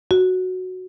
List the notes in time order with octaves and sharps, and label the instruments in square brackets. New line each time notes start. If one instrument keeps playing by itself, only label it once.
[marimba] F#4